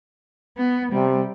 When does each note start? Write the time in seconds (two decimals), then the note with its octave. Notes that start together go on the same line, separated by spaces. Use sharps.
0.58 B3
0.93 C3 G3